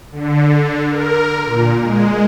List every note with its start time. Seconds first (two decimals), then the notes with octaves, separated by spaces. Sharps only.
0.12 D3
0.88 A#4
1.44 A#2
1.81 G#3